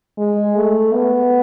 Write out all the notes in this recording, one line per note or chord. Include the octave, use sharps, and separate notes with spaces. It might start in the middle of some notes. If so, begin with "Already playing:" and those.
G#3
A3
B3